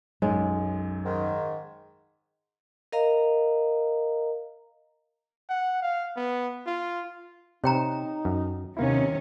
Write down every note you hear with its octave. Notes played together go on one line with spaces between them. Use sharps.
B1 F#2 G#3
G#2 D#3
A#4 D#5 F5 A#5
F#5
F5
B3
F4
C3 D#4 C#5 G5 A#5
F#2
D#2 C3 A#3 C#4 D#4 E4